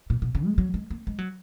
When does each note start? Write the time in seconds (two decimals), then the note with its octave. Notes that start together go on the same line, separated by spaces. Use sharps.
0.10 A#2
0.22 B2
0.35 C#3
0.46 G#3
0.58 F#3
0.74 G#3
0.91 A#3
1.07 G#3
1.18 F#3